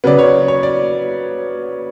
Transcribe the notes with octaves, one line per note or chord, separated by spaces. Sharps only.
C#3 F#3 B3 D5
C#5
C#5
D5